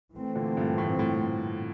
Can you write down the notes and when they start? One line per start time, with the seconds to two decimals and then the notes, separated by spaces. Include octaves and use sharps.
0.14 E3 A3 C4
0.35 A#2 D3
0.57 G2 A#2
0.78 A2
0.99 A2